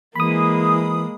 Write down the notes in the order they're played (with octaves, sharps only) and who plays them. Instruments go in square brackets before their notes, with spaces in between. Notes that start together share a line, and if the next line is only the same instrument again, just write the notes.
[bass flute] E3 [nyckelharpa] G#3 A#3 [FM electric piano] B5 D#6